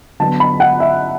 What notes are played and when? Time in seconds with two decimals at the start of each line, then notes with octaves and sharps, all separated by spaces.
0.20 D3 F#3 B3 A5
0.40 B5
0.60 F#5
0.80 E5